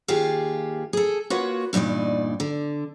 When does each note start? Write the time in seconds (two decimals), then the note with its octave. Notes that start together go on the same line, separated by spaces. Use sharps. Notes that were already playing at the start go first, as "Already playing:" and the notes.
0.08 D#2 F4 G4 G#4
0.93 G#4 A4
1.30 A#3 F4 F#4 B4 C#5
1.73 E2 G2 A#2 D#4 D5
2.40 D3